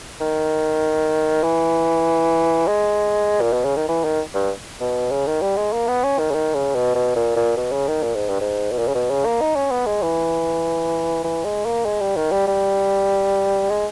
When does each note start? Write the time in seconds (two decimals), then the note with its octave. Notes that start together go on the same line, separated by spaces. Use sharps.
0.21 D#3
1.43 E3
2.67 G#3
3.41 A#2
3.53 B2
3.65 C#3
3.76 D#3
3.88 E3
4.04 D#3
4.34 G2
4.81 B2
5.11 C#3
5.27 D#3
5.42 G3
5.57 G#3
5.73 A#3
5.88 B3
6.04 C#4
6.19 D#3
6.30 C#3
6.34 D#3
6.54 C#3
6.75 B2
6.95 B2
7.16 A#2
7.36 A#2
7.57 B2
7.72 C#3
7.88 D#3
8.03 A#2
8.15 G#2
8.28 G2
8.41 G#2
8.72 B2
8.79 A#2
8.88 C#3
8.95 B2
9.10 C#3
9.25 A#3
9.41 D#4
9.56 C#4
9.71 B3
9.86 G#3
10.02 E3
11.24 E3
11.44 G#3
11.65 A#3
11.85 G#3
12.00 G3
12.16 D#3
12.31 G3
12.47 G3
13.70 G#3